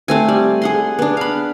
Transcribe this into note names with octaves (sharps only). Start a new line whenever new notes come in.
A3 C4 G#5
G3
G#4 F#5 C6
B3 D4
F5 B5